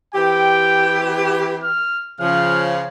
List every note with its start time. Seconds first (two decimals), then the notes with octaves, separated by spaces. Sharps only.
0.15 E3 C4 G4 G5
1.64 F6
2.20 C#3 F3 F6